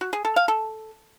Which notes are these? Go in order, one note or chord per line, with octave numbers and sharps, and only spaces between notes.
F#4
G#4
A4
F5
A4